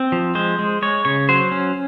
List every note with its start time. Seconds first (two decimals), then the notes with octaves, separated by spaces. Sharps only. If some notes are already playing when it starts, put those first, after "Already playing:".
Already playing: C4
0.12 F3
0.35 G#3 C5
0.59 G#3
0.82 G#3 C#5
1.05 C#3 C#5
1.29 F#3 C5
1.52 C#4